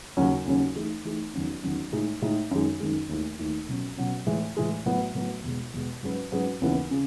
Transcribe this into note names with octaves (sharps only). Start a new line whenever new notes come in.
D#2 C#3 F#3 C#4
D#2 C#3 F#3 C#4
E3 A3 D#4 G#4
E3 A3 D#4 G#4
E2 D#3 F#3 C#4
E2 D#3 F#3 C#4
A2 G#3 D#4
A2 G#3 D#4
F#2 D#3 G#3
F#2 D#3 G#3
D#2 D#3 A3 E4
D#2 D#3 A3 E4
B2 F#3 C#4
B2 F#3 C#4
A2 E3 G#3
A2 E3 G#3
A2 F#3 B3
A2 F#3 B3
E2 B2 G#3
E2 B2 G#3
G#2 F#3 C#4 G#4 B4
G#2 F#3 C#4 G#4 B4
D#2 C#3 E3 B3
C#3